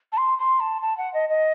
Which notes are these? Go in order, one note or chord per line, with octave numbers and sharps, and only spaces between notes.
A5
C6
C6
A5
A5
F#5
D#5
D#5